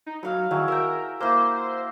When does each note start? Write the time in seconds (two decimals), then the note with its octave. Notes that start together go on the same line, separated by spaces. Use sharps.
0.06 D#4
0.23 F#3 F5 B5
0.51 D#3 F#3 E4 G#4
0.68 A#4 E5 G5
1.20 A#3 E4 C5